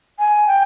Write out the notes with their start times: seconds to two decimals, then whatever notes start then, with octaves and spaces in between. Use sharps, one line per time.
0.19 G#5
0.47 G5